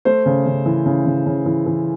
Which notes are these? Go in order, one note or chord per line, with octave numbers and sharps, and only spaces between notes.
A3 C5
C#3
C#3
E3
C#3
C#3
C#3
E3
E3